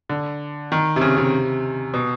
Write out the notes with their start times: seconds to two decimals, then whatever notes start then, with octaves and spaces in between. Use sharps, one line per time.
0.09 D3
0.72 D#3
0.96 C3
1.01 C#3
1.17 C3
1.94 B2